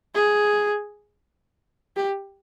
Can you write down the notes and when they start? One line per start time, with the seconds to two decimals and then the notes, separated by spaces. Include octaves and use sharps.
0.15 G#4
1.97 G4